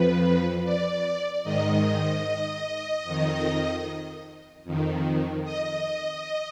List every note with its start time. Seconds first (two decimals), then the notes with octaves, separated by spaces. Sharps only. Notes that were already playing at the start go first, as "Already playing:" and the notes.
Already playing: F2 F3 B4
0.64 D5
1.43 G#2 D#3 D#5
3.04 F2 D#3
4.64 F2 D#3
5.44 D#5